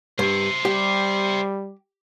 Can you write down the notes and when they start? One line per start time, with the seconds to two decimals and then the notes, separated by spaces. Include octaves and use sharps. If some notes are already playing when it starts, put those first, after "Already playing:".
0.19 G2 C5 E5
0.65 G3 G4